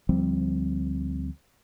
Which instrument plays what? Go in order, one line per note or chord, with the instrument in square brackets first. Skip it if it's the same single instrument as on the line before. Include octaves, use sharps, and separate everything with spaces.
[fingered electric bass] D2 F3 G3 C4